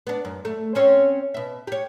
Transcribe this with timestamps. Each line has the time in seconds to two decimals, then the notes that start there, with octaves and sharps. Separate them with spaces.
0.07 B3 D4
0.25 F#2
0.45 A3
0.75 C4 C#4 C#5
1.34 B2 E5
1.67 G4 C#5